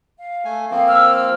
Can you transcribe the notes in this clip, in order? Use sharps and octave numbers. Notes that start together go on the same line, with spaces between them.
F5
A3 G#5
F3 A#3 C4 F5
E6 F6